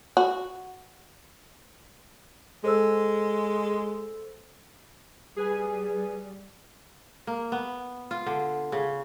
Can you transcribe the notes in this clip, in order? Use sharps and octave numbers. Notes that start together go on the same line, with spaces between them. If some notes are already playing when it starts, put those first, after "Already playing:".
F#4
G#3 A4 C5 E6
G3 G#4 B4 G#5
A#3
B3
F4
D3
C#3